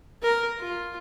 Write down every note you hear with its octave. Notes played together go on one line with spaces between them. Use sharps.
A#4
F4